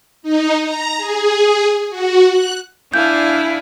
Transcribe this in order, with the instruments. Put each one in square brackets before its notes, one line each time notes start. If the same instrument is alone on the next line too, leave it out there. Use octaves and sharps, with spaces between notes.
[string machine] D#4
A#5
G#4
F#4
F#6
[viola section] D4 F5 G#5 [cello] E4 [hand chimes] G6